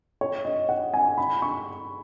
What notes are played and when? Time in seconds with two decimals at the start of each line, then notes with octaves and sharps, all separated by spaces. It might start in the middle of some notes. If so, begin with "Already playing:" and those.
0.21 C#5
0.45 D#5
0.69 F#5
0.94 G#5
1.18 B5
1.42 C#6